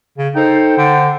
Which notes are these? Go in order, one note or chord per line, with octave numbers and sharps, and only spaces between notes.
C#3
D#4 A4 C5 G5
D3